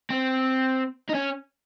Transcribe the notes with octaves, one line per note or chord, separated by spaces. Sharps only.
C4
D#4
C#4